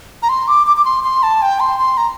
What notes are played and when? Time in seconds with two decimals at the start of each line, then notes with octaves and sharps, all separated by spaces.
0.23 A#5
0.29 C6
0.48 D6
0.67 D6
0.77 D6
0.85 C6
1.04 C6
1.23 A5
1.42 G5
1.60 C6
1.79 C6
1.97 A#5